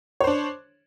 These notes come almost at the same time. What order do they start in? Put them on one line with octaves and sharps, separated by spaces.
C#5 C5 D4